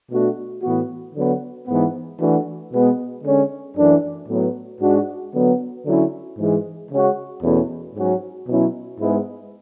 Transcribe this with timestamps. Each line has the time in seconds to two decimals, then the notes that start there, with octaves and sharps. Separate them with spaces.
0.10 B2 A3 D4 F#4
0.62 A2 E3 B3 F#4
1.14 D3 F#3 B3
1.67 G#2 E3 B3
2.19 E3 A3 D4 F#4
2.71 B2 G#3 B3
3.24 D3 G#3 C#4
3.76 F#2 E3 A3 D4
4.29 A2 F#3 B3
4.81 G#2 G#3 D4 F#4
5.33 D3 F#3 B3
5.86 D3 F#3 C#4 E4
6.38 G#2 E3 G#3
6.90 C#3 G#3 C#4 F#4
7.42 E2 B2 A3 C#4 E4
7.95 G#2 F#3 C#4 F#4
8.47 B2 F#3 C#4 E4
8.99 G#2 G#3 B3 E4